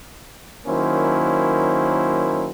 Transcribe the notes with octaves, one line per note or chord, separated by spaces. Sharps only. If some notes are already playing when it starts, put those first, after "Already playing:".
D#3 F#3 A#3 C#4 E4 C5